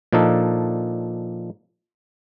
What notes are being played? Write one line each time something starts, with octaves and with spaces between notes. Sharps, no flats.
A#2 F3 D4 D#4 A4